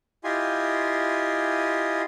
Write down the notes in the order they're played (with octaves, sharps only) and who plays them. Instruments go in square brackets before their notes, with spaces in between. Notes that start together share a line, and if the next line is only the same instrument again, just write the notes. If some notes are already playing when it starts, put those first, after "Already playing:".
[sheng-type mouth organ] E4 F4 G4 D#5 G#5 C6